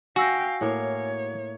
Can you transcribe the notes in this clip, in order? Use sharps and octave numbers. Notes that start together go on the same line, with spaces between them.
F#4 F5 G5 G#5 E6 A#6
A2 A#3 C#5 F5